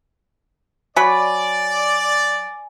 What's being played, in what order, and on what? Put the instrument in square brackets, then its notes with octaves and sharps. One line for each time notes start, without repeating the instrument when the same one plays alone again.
[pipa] F#3 B5 [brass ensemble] D5 [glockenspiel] G#5